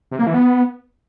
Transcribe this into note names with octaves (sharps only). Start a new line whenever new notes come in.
C3
A#3
E3
B3